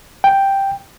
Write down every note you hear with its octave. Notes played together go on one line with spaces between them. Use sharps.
G5